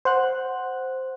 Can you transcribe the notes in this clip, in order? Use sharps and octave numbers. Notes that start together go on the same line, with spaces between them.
C5 F#5 F#6